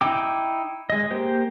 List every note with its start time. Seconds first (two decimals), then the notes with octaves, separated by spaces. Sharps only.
0.01 D#4 E4 G5 D6
0.90 G#3 D#5
1.11 A#3 G4 C5